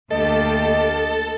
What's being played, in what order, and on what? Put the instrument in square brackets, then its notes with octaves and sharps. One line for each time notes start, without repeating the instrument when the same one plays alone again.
[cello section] D2 A#3 G4 [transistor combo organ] A4 [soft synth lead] D#5